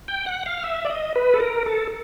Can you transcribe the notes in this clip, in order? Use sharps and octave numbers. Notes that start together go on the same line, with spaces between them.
G5
F#5
F5
E5
D5
D#5
B4
A4
A#4
A4